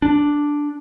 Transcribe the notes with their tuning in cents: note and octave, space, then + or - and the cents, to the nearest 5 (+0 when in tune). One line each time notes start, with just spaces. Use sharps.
D4 +0